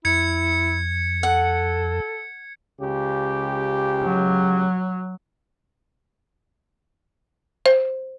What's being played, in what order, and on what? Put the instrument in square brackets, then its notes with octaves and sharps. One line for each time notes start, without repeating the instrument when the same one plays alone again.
[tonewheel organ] F2 [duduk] E4 [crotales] G#6 C#7
[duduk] A4 [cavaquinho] F#5
[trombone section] C#2 C#3 G4
[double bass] F#3
[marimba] C5